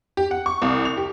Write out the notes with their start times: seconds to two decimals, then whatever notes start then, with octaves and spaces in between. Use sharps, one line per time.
0.17 G4
0.31 F#5
0.46 C#6
0.62 C2
0.85 F7
0.97 G4